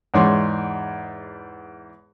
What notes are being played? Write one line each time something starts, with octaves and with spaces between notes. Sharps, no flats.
E2 G#2 C#5 D5 C6 D6